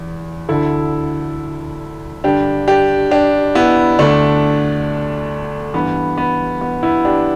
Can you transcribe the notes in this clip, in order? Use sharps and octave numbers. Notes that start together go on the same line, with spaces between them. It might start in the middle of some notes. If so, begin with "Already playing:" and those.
Already playing: E2
D2 D3 E4 A4
G2 D3 D4 G4
D4 G4
D4 G4
B3 E4
D2 D3 A3 D4
G2 E3 B3
B3
B3
B3 E4
D4 G4